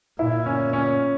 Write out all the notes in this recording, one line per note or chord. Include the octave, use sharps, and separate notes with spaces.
A#2 E4
C#4
C#4